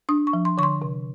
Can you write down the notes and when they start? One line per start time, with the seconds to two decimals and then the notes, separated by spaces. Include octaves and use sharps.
0.09 D4 D#6
0.27 C#6
0.33 F3
0.45 C6
0.58 D3 C#6
0.63 C6
0.82 C3